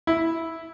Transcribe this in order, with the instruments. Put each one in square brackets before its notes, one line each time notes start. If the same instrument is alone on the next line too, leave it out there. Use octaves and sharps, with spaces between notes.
[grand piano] E4